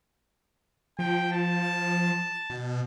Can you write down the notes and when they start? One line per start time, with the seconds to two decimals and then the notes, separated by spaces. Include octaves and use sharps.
0.99 F3 G5
1.32 A5
2.50 B2